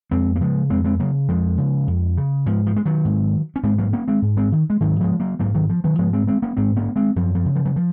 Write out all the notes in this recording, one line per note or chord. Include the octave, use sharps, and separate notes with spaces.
F2 G#3 C4
A#3
C#3 F3 G#3
F2 G#3 C4
G#3 C4
C#3 F#3 A#3
F2 F3 G#3
C#3
F2
C#3
G#2 F3
F3
G#3
D#3 F#3
G#2
C#4
G#2 G#3 C4
F#3 A#3
A#3 C#4
G#3 C4
G#2
G#3 C4
D#3
G#3
G#2 D#3 F#3
F3 G#3
F#3 A#3
G#2 F#3 A#3
D#3 F#3
F3
D#3 F#3
G#2 F3 G#3
G#3 C4
G#3 C4
A#3 C#4
G#2 G#3 C4
A#3 C#4
G#3 C4
F#2 F3
F3
C#3
F3
F#3
F3